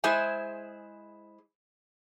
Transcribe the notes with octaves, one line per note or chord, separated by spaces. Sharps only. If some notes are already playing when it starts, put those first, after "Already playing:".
G#3 E4 G#4 C5 E5 G#5